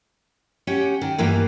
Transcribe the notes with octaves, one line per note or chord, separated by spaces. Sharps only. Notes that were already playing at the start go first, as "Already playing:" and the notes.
C#4 G4 F#5
D#3
G2 E3 A#3 B3